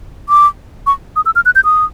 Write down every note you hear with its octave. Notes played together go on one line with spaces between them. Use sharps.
D6
C#6
D#6
E6
F6
F#6
G6
D#6